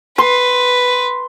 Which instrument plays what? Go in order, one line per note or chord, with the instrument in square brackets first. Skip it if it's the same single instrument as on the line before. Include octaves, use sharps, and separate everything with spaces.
[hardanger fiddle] B4 [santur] C6